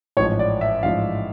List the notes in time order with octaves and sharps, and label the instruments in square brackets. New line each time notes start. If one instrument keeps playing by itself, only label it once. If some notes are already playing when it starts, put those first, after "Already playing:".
[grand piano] A1 G#2 F3 C#5
D5
E5
A1 G#2 F3 F5